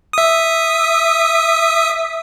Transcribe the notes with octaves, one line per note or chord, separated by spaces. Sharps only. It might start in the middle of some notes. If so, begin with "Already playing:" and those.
E5 D#6